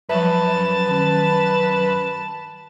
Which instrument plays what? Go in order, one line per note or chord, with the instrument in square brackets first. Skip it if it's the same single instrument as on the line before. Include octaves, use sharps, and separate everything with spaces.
[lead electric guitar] F#2 [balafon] F3 G3 E5 [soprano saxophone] B4 [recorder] A5
[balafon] D#3 C#4